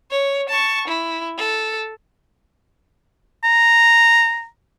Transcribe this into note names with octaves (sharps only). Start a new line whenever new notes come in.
C#5
A5 C#6
E4
A4
A#5